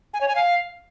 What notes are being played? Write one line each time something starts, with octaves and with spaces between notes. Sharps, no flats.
G#5
C#5
G#5
F5